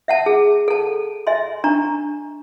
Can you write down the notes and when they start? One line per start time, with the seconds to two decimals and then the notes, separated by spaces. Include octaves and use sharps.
0.08 E5 F#5 A5
0.26 G#4
0.68 A4 A5
1.27 D#5 E5 G#5 C6
1.64 D4 A#5 C#6